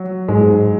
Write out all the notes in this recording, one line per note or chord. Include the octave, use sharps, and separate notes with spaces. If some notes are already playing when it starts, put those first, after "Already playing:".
Already playing: F#3
G#2 G#3